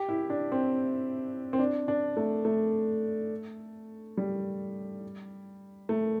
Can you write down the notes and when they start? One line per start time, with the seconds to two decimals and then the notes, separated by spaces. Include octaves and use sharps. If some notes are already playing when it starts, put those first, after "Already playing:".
Already playing: G4
0.09 E4
0.30 D4
0.52 C4
1.53 C4
1.59 D4
1.88 D4
2.17 A3
2.45 A3
4.17 G3
5.89 A3